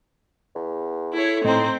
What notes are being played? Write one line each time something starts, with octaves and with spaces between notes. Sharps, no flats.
E2
E4 A4 C#5
A2 C4 D#4 C5 A#5